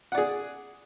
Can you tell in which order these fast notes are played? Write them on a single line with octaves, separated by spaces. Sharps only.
F#5 D5 G#4